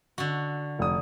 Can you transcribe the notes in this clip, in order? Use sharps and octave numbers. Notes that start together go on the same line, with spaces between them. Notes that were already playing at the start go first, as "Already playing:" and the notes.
D3 F#4
F1 D#6